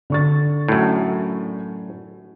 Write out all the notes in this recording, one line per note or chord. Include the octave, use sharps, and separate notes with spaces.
D3 C#6 A6
F#2 A2